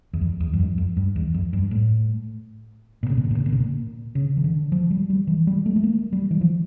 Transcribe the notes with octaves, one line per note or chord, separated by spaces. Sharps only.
E2
F2
E2
G2
F2
F2
G2
E2
F2
G2
A2
A#2
C#3
A#2
C#3
A#2
C#3
A#2
C#3
A#2
C#3
E3
D3
F3
G3
G3
E3
G3
A3
A3
A#3
G3
E3
F3